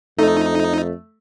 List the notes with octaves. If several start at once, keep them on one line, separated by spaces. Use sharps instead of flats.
F2 A3 D#4